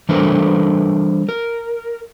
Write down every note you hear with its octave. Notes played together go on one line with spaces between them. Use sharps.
E3 G3 D4 A4 A#4 C5
A#4